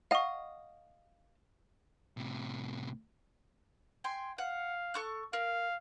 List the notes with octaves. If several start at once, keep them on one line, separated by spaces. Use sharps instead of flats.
D#5 F5 F#5 C#6
A2 C3
G5 G#5 C6
F5 F#5
A4 C#6 F#6
A#4 F5